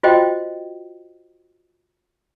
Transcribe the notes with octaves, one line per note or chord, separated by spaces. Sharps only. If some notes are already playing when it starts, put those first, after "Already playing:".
F4 F#4 C5 D#5 G5